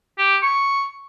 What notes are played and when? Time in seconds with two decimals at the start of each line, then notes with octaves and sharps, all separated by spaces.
0.18 G4
0.43 C#6